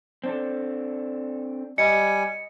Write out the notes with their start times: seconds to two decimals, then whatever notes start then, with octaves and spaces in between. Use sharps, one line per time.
0.24 C4 D4 A4
1.78 G3 D#5 G#5 C#7